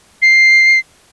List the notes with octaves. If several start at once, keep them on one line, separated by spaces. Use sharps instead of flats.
C7